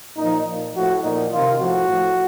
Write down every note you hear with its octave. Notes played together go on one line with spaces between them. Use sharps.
A#2 F3 D#4
A#2 F3
A2 F3 F#4
A#2 F3 D#4
C3 D#3 F4
A2 F3 F#4
A2 F3